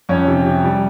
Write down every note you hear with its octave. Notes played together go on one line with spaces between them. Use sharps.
F2 C#4 C#5
C3
C3
G3